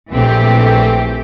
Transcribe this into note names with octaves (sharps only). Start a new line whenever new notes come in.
A#1 E3 A3 C4 G4